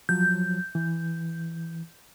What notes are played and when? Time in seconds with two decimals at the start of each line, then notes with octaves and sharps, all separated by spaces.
0.09 F3 F#3 G6
0.75 E3